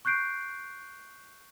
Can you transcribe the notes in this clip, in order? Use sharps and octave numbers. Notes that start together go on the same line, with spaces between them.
C#6 F#6 G6 C7 D7